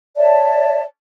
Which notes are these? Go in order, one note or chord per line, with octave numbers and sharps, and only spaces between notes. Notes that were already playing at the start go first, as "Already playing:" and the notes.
C#5 D5 E5 A5